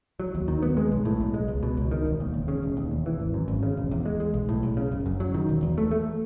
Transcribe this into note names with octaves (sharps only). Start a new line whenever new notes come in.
F#3
D#2
D#3
B3
G#3
B1
A2
B1
G#3
C#2
B2
C#2
D#3
E1
D#2
E1
C#3
E1
D#2
E1
E3
G#1
F#2
G#1
C#3
E1
E2
G#3
G#3
B1
A2
B1
C#3
F#1
F#2
F#3
D#3
E1
E2
A3
A3